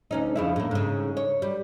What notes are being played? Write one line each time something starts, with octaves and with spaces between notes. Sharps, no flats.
D2 C#4 D#4
F2 C#3 E4
A2 A#3
G#2 C#3
C#5
G3